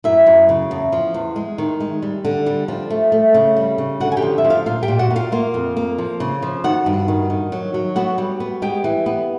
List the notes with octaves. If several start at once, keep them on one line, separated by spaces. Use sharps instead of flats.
F#2 E4 E5
F#2
C#3
E2
F3
E2
G#3
D#3
G#3
G3
D3
G3
F3
A3
A3
C#3
G3
C#3
D3 F#4 F#5
G#5
G4 G5
F3
E5
F3
F4 F5
A#2 F4 F5
G4 G5
A#2
F#4 F#5
A#2
F4 F5
A#3 F4 F5
F2
A#3
F3
C#3
F3
D#3 F#4 F#5
G2
D#3
D#3
F#3
F#3
B3 F#4 F#5
G3
B3
G#3 G4 G5
E3
B3